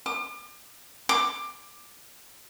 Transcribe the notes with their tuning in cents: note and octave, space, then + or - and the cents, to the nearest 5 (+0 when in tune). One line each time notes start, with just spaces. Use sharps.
D6 +40
D6 +15